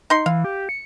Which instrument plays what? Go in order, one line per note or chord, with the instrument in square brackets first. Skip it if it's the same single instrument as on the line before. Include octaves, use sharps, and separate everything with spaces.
[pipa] D#4 C6
[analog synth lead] E3 [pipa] F5
[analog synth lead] G4
C#7